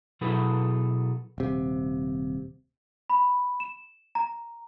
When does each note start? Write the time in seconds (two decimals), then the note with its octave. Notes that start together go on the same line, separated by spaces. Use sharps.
0.21 B2 F#3 E4 G#4 A4 B4
1.38 D#1 C3
3.10 B5
3.60 E7
4.15 A#5